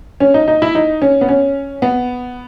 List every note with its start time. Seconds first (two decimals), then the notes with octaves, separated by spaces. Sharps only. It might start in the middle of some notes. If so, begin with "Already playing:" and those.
0.20 C#4
0.34 D#4
0.48 D#4
0.62 E4
0.75 D#4
1.02 C#4
1.21 B3
1.29 C#4
1.82 B3